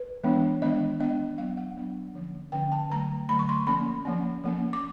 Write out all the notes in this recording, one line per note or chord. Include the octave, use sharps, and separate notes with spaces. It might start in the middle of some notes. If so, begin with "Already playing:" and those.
Already playing: B4
E3 G#3 B3 D4
D#3 G#3 B3 D4 D#5
D#3 G#3 B3 D4 D#5
F#3 B3 D4 F5
F#5
F#3 B3 D4
D3 F3 A#3 C#4
D3 F3 A#3 C#4 G5
A5
D3 F#3 A3 A#5
D3 F#3 A3 B5
C#6
C6
F3 A#3 C#4 B5
F3 A#3 C#4
F3 A#3 C#4
D6